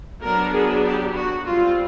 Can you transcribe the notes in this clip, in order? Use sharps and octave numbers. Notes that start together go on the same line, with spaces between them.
F#3 B3 D4 A#4
G#4
G4
F#4
G3 C4 F4